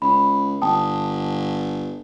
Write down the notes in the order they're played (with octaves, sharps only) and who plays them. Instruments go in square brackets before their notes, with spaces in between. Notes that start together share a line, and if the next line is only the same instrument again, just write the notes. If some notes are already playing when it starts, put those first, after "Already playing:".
[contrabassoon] C#2 [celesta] B5
[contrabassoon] G1 [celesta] G5 A5 D#6